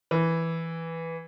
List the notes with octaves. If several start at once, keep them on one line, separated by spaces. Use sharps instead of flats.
E3